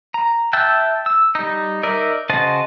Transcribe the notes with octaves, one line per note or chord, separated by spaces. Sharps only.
A#5
E5 G5 A5 E6 F#6
E6
G3 D#4
D#4 A#4 D5 E5
C#3 F#4 C5 D#5 A5